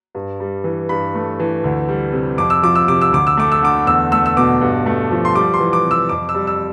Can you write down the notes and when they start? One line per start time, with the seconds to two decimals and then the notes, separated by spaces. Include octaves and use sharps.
0.15 G2
0.40 G3
0.64 E3
0.89 G2 B5
1.15 A3
1.40 E3
1.64 D2
1.89 G3
2.13 C3
2.38 F2 D6
2.50 E6
2.63 F3 D6
2.75 E6
2.88 C3 D6
3.02 E6
3.12 D2 D6
3.27 E6
3.37 A3 D6
3.52 E6
3.62 D3 D6
3.86 E2 E6
4.12 A3 E6
4.26 E6
4.37 B2 D6
4.61 G2
4.86 A3
5.11 F3
5.25 C6
5.35 G3 D6
5.54 C6
5.60 E3
5.73 D6
5.85 C3
5.91 E6
6.09 F2 D6
6.29 E6
6.35 G3
6.47 E6